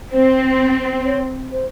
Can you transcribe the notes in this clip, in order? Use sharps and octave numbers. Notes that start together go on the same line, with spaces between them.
C4 C5
C#5
C5